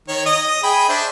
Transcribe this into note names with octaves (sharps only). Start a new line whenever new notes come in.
D#3 C#5
D#5 D#6
G#4 G5 B5
D4 C5 E5